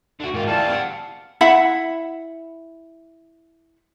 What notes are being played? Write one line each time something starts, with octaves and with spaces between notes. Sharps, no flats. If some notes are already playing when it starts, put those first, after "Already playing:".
D3 F#4
G#2 D#3 F4
D2 E3 G3 F5 A5
C4 F#5
E4 E5 F#5 B5